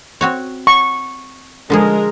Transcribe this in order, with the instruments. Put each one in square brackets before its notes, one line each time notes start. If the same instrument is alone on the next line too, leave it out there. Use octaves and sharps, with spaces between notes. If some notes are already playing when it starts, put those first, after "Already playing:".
[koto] C4 F#4 C#5
[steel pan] C#6
[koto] D3 F3 G#4 [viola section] G#3 A#4